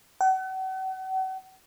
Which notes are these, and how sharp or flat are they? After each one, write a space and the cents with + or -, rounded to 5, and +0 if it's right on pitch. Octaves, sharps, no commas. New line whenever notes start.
F#5 +40